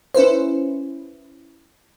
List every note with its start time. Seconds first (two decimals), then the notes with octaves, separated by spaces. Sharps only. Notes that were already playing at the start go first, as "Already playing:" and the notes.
0.14 C#4 E4 B4 C5